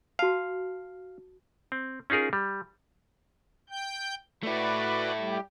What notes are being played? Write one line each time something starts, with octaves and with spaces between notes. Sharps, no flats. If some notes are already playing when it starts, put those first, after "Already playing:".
F#4 F5 A5
C4
C#4 D#4 F4 G#4 A#4
G3
G5 G6
A3 E4 F#4 B4 D5
G3 G4